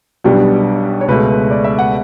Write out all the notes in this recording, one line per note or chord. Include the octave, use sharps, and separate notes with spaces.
B1 B2 G3 B3 D4 G4
C#5
C#2 B2 A3 B4
D5
E5
F#5